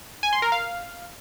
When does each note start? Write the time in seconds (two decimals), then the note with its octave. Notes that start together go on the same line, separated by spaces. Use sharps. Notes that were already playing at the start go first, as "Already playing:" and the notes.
0.23 G#5
0.33 C6
0.42 A#4
0.52 F5